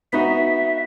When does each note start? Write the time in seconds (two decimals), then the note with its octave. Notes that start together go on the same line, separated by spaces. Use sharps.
0.13 B3 D#4 F#4 E5